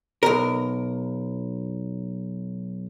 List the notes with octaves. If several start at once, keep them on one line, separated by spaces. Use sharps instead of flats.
B1 A#4